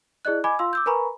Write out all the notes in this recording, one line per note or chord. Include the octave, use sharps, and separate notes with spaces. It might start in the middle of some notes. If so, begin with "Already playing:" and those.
E4 G#4 D5 D#5 F#6
D#5 G#5 B5 D6 G#6
F4 F5 C6 E6
D6 E6 G6
A#4 B4 G#5 A#5 B5 C#6